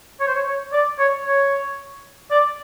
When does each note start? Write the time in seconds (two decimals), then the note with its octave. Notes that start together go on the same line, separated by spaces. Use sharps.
0.20 C#5
0.28 C5
0.35 C#5
0.46 C#5
0.73 D5
0.99 C#5
1.25 C#5
2.31 D5